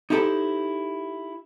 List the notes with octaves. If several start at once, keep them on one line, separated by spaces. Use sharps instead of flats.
D#4 E4 G4 A4 C5